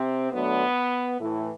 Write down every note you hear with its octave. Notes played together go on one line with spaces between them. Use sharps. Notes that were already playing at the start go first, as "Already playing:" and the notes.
Already playing: C3 C4
D2 D3 F#3 A3 B3
A2 E3 A3